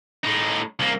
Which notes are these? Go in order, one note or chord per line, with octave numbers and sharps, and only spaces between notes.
A2 D#4
C2 A#3